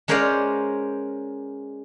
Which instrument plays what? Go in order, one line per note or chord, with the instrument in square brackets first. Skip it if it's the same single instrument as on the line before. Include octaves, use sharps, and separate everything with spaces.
[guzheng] G#3 C#4 A#4 C5 D5 F5